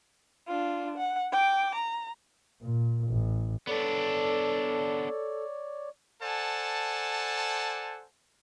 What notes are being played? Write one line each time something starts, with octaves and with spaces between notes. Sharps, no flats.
D4 F4
F#5
G5 D6
A#5
A#2
A1
B3 D4 A4 C#5 D5
A4 C5 D5 F#5 G#5 A5